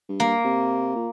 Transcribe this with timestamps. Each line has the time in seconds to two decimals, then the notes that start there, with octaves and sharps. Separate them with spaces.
0.09 G2
0.20 A#3
0.44 C3
0.95 A#2